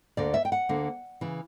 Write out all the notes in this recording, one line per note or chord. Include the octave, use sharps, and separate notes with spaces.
D2 D3 A#3 D5
E5
G5
F#5
D2 D3 A#3
C#3 E3